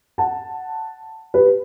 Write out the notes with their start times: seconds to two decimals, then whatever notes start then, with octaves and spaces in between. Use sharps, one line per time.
0.18 F#5 A5
1.34 G4 B4